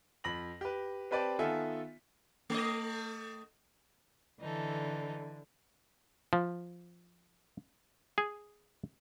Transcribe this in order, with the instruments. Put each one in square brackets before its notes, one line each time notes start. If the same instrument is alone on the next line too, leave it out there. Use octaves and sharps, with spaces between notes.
[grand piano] F2 B5 A#6 F#7
G4 B4
C4 G4 B4 D5 G5 A5
D#3 B3 F4 A4 E5 G#5
[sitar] A3 D#5
[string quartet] D3 [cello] E3 [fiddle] D#4 A4
[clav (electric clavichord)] F3
G#4